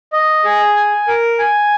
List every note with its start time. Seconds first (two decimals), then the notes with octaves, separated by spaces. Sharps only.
0.13 D#5
0.45 G#4
0.76 G#5
1.08 A#4
1.39 G#5